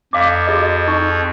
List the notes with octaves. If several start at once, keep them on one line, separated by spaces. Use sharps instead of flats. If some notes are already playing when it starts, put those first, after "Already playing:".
F2 F5 D6
F#4 G#4 D#5
D#4 C#6